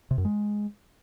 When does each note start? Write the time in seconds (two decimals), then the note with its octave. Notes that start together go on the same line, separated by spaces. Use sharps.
0.11 C3
0.18 F#2
0.25 G#3